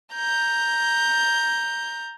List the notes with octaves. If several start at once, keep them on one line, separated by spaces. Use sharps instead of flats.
A#5 G6